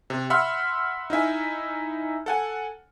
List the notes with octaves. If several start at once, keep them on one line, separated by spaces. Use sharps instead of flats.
C3
E5 F#5 B5 C6 E6 F6
D#4 E4 E5 G#5
A4 F#5 G#5